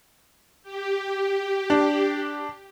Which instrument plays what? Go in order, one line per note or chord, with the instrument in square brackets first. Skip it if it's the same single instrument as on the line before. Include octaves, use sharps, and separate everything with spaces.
[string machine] G4
[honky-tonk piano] D4